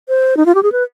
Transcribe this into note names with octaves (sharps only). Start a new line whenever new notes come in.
C5
D#4
F4
G4
G#4
B4